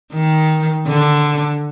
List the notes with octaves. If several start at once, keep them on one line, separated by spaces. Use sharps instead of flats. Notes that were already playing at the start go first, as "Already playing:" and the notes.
D#3
D3